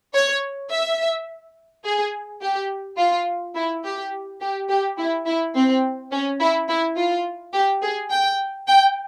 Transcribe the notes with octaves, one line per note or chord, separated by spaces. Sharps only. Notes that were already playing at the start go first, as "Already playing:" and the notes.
C#5
E5
G#4
G4
F4
E4
G4
G4
G4
E4
E4
C4
C#4
E4
E4
F4
G4
G#4
G5
G5